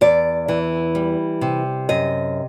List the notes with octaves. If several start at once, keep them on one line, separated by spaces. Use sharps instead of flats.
E2 D5
E3
G3
C3
F#2 D#5